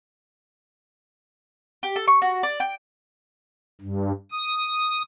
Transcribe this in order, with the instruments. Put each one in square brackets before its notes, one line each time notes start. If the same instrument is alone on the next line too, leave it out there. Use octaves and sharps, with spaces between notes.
[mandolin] G4
A4
C#6
F#4
D5
G5
[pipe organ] G2
D#6